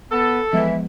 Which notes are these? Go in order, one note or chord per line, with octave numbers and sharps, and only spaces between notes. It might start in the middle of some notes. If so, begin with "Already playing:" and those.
B3 A4
E3 F3 G#3 B3 E5